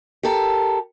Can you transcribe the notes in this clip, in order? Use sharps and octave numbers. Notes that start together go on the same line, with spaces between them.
G4 A4 A#4